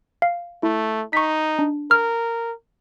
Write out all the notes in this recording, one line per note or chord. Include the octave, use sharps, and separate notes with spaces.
F5
A3 E4
D#4 C#6 B6
D4
A#4 F6